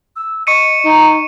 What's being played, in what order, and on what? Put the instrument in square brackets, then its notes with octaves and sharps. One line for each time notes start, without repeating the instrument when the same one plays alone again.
[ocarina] E6
[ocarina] D#5 [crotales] C#6 C#7 D#7
[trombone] D#4 [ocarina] A#5